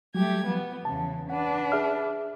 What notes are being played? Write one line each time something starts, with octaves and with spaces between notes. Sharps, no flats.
F#3 G3 A3 G4 G#6
F3 B3
E2 C#3 A5
D4 B4 F#5
G#4 E5 F6